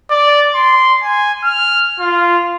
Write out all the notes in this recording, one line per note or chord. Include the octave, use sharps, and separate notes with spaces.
D5
C6
G#5
F6
F4